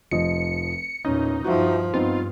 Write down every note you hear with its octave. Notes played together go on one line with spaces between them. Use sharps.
F1 F3 D#5 C#7
E2 A#2 C#4 D#4
G2 F3 F#4 E5
G2 B3 C4 D#4 F4